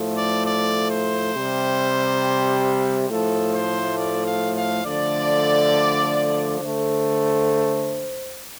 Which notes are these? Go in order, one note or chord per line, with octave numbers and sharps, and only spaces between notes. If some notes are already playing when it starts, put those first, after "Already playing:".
Already playing: A2 F3 A3
D5
D5
C5
C3 G3
A2 F3 A3 A4
C5
D5
F5
F5
D3 F3 A3 D5
D3 A3 C5